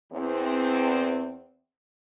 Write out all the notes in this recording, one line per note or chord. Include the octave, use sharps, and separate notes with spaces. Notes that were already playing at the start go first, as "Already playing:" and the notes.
E2 C4